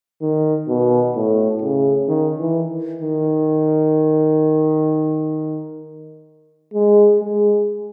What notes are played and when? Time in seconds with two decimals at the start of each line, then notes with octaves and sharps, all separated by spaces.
0.22 D#3
0.68 B2
1.16 A2
1.62 C#3
2.08 D#3
2.39 E3
3.02 D#3
6.74 G#3
7.20 G#3